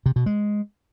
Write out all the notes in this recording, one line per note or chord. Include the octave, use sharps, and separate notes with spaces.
C3
B2
G#3